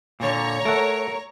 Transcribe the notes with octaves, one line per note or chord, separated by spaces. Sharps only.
A#2 D3 C#5 A#5
A3 A4 A#4 F#5